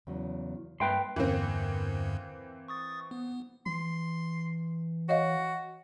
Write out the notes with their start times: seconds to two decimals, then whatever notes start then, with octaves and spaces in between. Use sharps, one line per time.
0.07 E2 C#3 F#3
0.80 G2 A#3 B4 E5 G5 C6
1.16 E2 G2 D3 E3 A#3 C4
2.68 C#6 D#6 A6
3.11 B3
3.66 E3 C6
5.09 F#4 C#5 D#5 F5